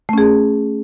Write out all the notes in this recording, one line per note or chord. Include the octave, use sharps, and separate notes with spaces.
A3 C#4 G#4